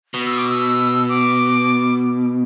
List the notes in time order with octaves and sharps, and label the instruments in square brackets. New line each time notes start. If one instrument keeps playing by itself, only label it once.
[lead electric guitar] B2
[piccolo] E6
D6
E6
D6